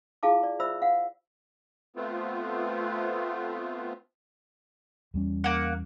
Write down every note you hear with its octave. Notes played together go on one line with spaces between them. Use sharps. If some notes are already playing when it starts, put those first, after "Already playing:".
E4 F4 G#4 F5 A5 D6
D5
F4 C5 E5 B5 E6
F5 F#5
A3 B3 C4 F4
E2 G3 C#4
A#3 F#5